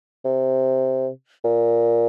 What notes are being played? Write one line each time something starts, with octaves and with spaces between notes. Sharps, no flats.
C3
A#2